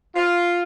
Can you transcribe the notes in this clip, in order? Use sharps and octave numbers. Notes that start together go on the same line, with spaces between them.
F4